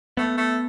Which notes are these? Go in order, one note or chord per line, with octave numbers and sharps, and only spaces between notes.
A3 B3
A3